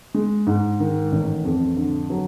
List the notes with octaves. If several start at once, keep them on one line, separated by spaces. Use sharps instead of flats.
G#3
G#2
D#3
A1
F2
D3
F#3